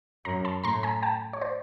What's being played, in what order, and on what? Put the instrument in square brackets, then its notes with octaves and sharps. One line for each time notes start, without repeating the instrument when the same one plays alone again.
[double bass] F#2 [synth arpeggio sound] A#5 C6
[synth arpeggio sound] A5 B5
[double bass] A2 [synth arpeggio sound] A#5 C6
[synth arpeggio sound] G#5 A#5
G5 A5
C#5
C5 D5